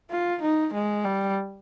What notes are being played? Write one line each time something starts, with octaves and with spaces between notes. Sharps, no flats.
F4
D#4
G#3
G3